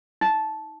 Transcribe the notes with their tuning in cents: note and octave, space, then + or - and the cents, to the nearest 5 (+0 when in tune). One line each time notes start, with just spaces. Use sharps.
D#4 +30